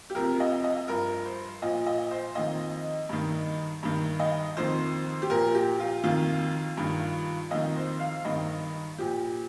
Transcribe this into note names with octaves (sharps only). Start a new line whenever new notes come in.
G4
F2 C3 F3 A#4
D#5
D#5
G2 F3 A#4
C5
A#2 F3 D#5
D#5
C5
F2 D#3 D#5
G2 D#3
G2 D#3
D#5
F2 D#3 C5
G4
A#2 F3 A#4
G4
F4
F2 D#3 F4
G2 D#3
F2 D#3 D#5
C5
F5
G2 D#3 D#5
A#2 F3 G4